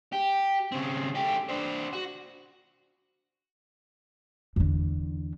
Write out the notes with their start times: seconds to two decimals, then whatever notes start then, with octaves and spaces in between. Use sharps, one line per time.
0.13 G4
0.72 C#3 C4
1.15 A3 G4
1.49 D4 C5
1.93 F#4
4.56 E2 D3